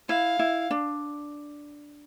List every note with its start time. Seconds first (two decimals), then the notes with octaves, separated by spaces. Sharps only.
0.08 E4 F5
0.39 E4
0.71 D4